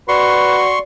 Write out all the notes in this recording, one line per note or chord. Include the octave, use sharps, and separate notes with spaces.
F#4 B4 D5 C6 C#6